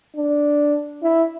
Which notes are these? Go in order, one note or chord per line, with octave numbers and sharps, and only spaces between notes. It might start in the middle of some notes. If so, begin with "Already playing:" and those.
D4
E4